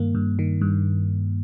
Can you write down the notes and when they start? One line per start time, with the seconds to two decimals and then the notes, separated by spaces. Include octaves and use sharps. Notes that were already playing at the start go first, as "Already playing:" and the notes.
Already playing: G2 D#3 A#3
0.15 G2
0.39 D#3
0.61 G2